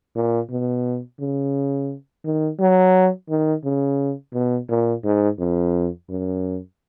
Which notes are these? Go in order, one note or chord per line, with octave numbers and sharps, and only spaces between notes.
A#2
B2
C#3
D#3
F#3
D#3
C#3
B2
A#2
G#2
F2
F#2